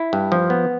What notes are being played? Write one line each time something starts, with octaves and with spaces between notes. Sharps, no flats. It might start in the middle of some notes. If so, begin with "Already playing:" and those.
Already playing: E4
G2
F3
B3